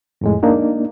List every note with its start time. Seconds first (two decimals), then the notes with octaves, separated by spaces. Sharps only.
0.21 F2 A2 G#3
0.43 A#3 D4 D#4